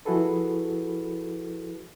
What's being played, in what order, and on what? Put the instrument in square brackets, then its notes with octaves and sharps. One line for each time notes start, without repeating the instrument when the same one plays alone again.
[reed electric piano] F3 E4 F#4 G#4 A4 B4